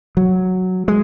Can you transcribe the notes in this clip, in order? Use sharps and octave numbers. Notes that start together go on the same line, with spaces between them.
F#3
G#3